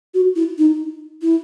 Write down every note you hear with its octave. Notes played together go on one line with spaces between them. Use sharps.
F#4
E4
D#4
E4